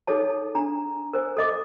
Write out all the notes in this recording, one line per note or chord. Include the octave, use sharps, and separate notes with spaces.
D#4 G#4 A4 C#5 A5
D4 A#5
A#4 C5 G#5
A4 D#5 D6